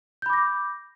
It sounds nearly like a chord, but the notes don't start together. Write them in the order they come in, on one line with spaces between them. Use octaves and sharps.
G6 B5 D6 A#6